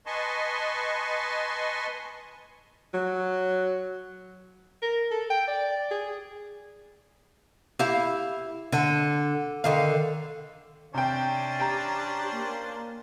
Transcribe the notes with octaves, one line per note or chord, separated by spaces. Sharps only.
B4 D#5 G#5 A5 C6 C#6
F#3
A#4
A4
G5
D5
G#4
E4 G4 F5
D3
D3 D#3 F5
C3 C#4 D4 C5 G5
G4 G5 A#5
A#3